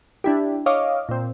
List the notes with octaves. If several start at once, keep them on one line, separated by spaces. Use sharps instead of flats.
D4 E4 G4
C#5 D#5 F5 D6
A#2 C4